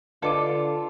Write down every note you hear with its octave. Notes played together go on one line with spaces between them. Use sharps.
D3 F4 A4 B4 D#5 F5 D6